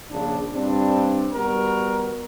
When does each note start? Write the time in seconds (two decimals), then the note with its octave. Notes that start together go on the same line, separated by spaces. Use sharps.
0.11 A#1 C#3 D4
0.53 G2 C4 D4
1.34 G3 B3 F#4 A#4